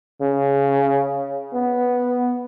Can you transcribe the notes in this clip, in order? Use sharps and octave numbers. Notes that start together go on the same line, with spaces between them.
C#3
B3